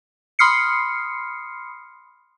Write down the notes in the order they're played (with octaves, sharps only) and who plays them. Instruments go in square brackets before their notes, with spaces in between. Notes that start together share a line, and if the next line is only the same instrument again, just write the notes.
[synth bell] B5 C6 D#6 F6 C7 C#7